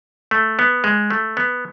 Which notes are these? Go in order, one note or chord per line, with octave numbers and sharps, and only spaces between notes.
A3
B3
G#3
A3
B3